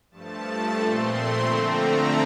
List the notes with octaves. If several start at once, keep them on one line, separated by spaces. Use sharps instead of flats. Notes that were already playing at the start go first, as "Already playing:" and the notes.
G2 F3 A3 A5
A#2 A3 C4 C6
D3 F3 A3 C4 A#5